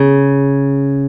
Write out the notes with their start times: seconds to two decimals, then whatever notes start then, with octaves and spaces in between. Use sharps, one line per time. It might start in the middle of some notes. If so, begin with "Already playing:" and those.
Already playing: C#3